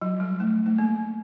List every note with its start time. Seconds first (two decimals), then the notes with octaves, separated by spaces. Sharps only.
0.01 F#3
0.20 G3
0.40 A3
0.66 A3
0.78 A#3